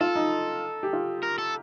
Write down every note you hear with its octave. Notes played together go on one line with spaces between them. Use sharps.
F4 A4
D#4
G4
F4
A#4
A4